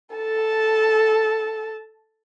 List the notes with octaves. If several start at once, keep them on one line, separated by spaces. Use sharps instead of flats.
A4 A5